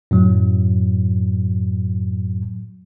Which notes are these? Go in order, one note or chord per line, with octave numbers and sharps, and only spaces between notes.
F#2 A2 F#3